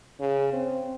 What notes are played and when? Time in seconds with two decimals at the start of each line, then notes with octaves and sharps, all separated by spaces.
0.19 C#3
0.53 C4